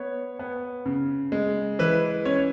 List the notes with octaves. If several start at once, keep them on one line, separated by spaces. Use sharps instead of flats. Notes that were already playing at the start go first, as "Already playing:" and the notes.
Already playing: B3 C#5
B3
C#3
G#3
E3 B4
C#4 C#5